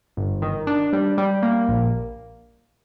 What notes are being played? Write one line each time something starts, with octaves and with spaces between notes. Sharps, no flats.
G1
D#3
D4
G3
G3
A#3
A#1